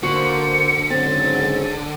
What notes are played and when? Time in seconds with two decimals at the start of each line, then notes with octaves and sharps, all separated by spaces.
0.03 D3 A#3 F#4 C5 C#7
0.90 G#2 C#3 F#3 C4 A6